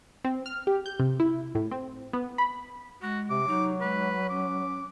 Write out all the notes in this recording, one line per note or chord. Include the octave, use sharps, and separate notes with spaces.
C4
F6
G4
G6
C3
E4
A2
C4
B3
B5
G#3 F#4
C3 D6
F#3 D#4
G#3 B4
C#4 D6